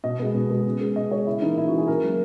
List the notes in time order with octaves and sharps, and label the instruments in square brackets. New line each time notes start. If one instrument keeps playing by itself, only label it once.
[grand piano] B2 D#5
G#3 B3
B2
G#3 B3
C#3
G#3 B3
C#3 D#5
G#3 B3 C#5
C#3 E4
E3 A#3 D#4
C#3 E4
F#4
E3 A#3 G#4
C#3 A#4
F#3 A#3